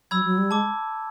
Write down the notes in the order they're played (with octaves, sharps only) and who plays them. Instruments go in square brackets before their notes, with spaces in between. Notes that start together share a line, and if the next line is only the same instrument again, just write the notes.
[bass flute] F#3 [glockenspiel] B5 E6 G#6
[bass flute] F#3
G3
[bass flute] G#3 [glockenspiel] A5 D6